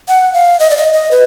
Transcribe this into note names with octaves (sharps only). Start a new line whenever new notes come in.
F#5
F5
D#5
D5
D#5
D#5
B4